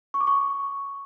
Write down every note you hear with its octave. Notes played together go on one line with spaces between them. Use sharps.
C#6
D6
C#6